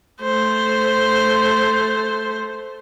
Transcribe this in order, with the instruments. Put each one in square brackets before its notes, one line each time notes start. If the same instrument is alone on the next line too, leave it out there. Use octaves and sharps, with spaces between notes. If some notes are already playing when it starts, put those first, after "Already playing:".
[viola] A3 C5